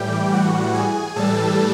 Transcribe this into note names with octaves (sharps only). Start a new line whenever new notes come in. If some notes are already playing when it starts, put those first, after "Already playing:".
Already playing: A2 E3 G3 G4 G5
F#4 F#5
G#4 G#5
A2 E3 G3 A4 A5